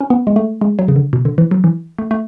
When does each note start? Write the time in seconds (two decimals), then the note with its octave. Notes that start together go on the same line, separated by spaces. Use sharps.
0.01 C#4
0.10 B3
0.27 G#3
0.36 A3
0.61 G#3
0.79 F#3
0.88 C#3
0.96 D3
1.13 B2
1.25 D3
1.38 E3
1.51 F#3
1.64 E3
1.99 A3
2.11 A3